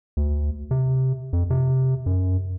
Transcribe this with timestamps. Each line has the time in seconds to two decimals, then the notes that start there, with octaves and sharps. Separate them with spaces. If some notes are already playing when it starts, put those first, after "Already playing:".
0.17 D2
0.71 C3
1.33 F2
1.50 C3
2.06 F#2